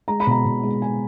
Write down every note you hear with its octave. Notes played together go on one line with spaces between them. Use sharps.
G#3 A#5
B5
B2 A#5
B2
G#3
G#3 G#5